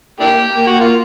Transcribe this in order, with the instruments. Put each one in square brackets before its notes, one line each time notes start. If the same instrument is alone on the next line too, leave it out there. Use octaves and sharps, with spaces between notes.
[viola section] A#3 [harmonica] D4 E4 G4
[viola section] A#3
[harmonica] F#4
F4